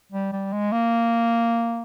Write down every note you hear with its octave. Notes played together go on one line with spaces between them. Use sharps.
G3
G3
G#3
A#3